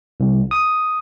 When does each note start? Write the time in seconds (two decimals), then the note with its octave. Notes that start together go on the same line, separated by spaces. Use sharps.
0.20 C2
0.51 D#6